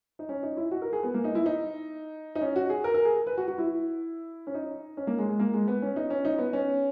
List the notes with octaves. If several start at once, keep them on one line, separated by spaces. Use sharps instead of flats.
D#4
C#4
D#4
E4
F#4
A#4
G#4
B3
A#3
D#4
E4
D#4
D#4
C#4
F#4
G#4
A#4
A#4
G#4
B4
F#4
F#4
E4
C#4
D#4
C#4
A#3
G#3
G#3
A#3
G#3
B3
C#4
D#4
C#4
D#4
B3
C#4